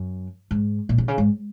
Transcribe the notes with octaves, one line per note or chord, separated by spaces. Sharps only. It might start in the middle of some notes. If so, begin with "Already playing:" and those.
Already playing: F#2
G#2
A#2
C3
C#3
G#2